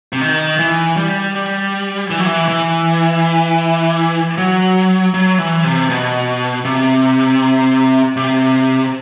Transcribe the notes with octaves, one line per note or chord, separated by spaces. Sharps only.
C3
D#3
E3
G3
G3
E3
F#3
E3
E3
F#3
F#3
E3
C3
B2
C3
C3